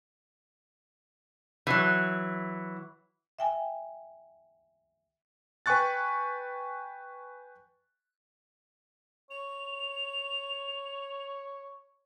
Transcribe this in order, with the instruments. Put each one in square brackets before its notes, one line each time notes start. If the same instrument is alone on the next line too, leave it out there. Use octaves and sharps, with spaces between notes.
[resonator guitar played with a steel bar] E3 F#3
[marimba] E5 G5 G#5
[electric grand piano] B4 G5 G#5 C#6 F#6 A6
[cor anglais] C#5 [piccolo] F7